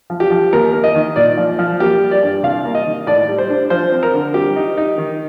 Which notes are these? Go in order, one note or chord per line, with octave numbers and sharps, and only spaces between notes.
F3
G4
F3
D#2 A#4
A#3
D#5
D#3
A#2 D5
F3
F3
A#3 G4
G3
D5
G2
C2 F5
A#3
D#5
D#3
A2 D5
G3
C5
D4
F3 C5
C4
A#4
D3
G3 G4
D#4
D#4
D#3